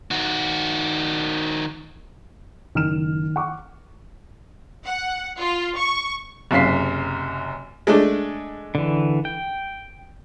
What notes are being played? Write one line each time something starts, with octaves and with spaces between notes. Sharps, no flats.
D#3 F#4
F#1 D#3 F6 E7
F#5 C#6 D6
F#5
F4
C#6
F#1 F#2 C3 F5 B6 C7
G#3 A3 D4
D3 E3
G5